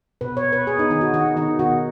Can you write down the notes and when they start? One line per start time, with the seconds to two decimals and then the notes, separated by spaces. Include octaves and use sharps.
0.21 B2 B4
0.37 C#5
0.44 B2
0.53 B4
0.67 B3 G#4
0.79 D#4
0.90 D#3 D#4
1.01 F#4
1.14 D#3 F#4
1.37 D#3 D#4
1.59 B2 F#4